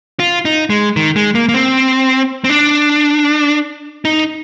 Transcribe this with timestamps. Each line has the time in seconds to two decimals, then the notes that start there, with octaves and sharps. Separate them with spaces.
0.20 F4
0.45 D#4
0.70 G#3
0.96 D#3
1.16 G#3
1.35 A#3
1.49 A#3
1.54 C4
2.44 C4
2.50 D4
4.05 D#4